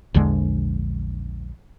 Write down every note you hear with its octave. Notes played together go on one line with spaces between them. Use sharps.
A#1 E2 D3 G#3